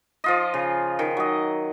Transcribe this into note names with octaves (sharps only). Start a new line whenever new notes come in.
F3 F4 D#5
C#3
D#3
F#3 D#5